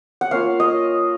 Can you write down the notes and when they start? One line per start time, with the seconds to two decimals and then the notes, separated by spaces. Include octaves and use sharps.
0.21 F#5
0.31 A#3 C#4 F4 F5
0.60 D#5